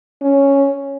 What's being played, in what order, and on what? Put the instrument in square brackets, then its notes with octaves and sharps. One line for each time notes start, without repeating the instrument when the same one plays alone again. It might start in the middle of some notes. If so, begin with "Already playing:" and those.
[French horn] C#4